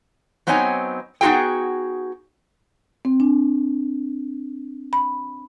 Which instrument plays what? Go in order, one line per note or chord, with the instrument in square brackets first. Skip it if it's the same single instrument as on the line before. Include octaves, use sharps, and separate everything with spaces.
[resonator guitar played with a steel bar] F#3 B3 C4 D#4 C#5 G#5
B3 D#4 E4 F#4 G#4 G5
[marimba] C4
D4
B5